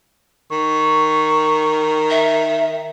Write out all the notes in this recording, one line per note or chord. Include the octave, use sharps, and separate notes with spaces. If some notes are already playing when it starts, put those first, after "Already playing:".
D#3 C#6
E5